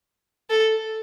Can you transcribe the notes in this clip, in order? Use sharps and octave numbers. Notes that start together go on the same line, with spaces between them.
A4